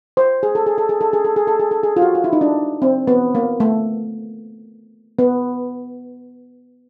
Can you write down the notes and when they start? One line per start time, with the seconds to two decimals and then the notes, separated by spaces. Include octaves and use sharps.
0.17 C5
0.43 G#4
0.55 A4
0.66 G#4
0.78 A4
0.89 G#4
1.01 A4
1.13 G#4
1.24 A4
1.36 G#4
1.47 A4
1.60 G#4
1.71 A4
1.83 G#4
1.96 F4
2.02 F#4
2.15 F4
2.24 E4
2.33 D#4
2.41 D4
2.82 C4
3.07 B3
3.35 A#3
3.60 A3
5.19 B3